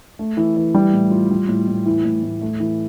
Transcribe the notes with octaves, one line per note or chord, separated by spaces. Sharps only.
A3
E3
E3
G3
A2
F4
G3
A2
A2
E3
A2
A2
A3
E3